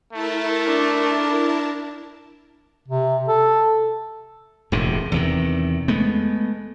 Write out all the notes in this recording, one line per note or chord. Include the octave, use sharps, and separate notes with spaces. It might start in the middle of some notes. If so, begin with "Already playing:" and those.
A3 E4 A#4 A5
D4
C3
A4
E1 A2 C3
E2 C3 D#3
G#3 A3 B3